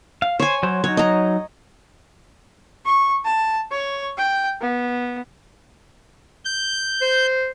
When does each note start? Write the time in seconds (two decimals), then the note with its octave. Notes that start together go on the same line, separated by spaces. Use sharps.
0.22 F5
0.40 C5 C#5 G#5
0.63 F#3 C5
0.84 F#3 D#4 C#5
0.97 D#5 A#5
2.85 C#6
3.24 A5
3.71 C#5
4.17 G5
4.61 B3
6.45 G6
7.02 C5